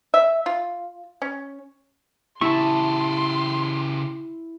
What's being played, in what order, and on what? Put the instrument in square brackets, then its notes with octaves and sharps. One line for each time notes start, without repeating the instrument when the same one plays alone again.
[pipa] E5
F4
C#4
[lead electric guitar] C#3 G4 [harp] E4 [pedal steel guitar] A5 C#6 [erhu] C6